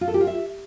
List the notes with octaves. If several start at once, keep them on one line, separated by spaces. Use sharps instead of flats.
F4
A4
G4
F4
E5